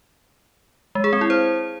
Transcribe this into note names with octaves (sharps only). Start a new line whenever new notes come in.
G#3
G#4
C4
E4
C5